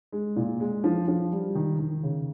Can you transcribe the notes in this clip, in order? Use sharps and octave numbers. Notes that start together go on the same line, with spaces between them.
G#3
A#2
G#3
F3
F3
G3
D#3
D#3
C#3